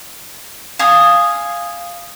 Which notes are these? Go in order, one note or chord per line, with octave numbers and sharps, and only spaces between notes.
F5 G#5 D#6